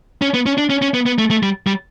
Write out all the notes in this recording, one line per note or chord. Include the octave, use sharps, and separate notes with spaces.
C#4
B3
C#4
D4
C#4
C#4
B3
B3
A3
A3
G3
G3